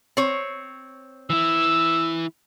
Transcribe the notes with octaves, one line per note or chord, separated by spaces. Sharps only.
C4 C#5
E3 E4 E6